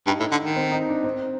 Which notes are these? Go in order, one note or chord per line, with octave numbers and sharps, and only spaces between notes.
G2 D#4
A2
D3
D#3
C4
D#4
D4
C4